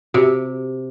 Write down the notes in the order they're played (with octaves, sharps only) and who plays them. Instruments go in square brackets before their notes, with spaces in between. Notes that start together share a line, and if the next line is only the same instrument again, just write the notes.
[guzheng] C3 [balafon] F#4 G4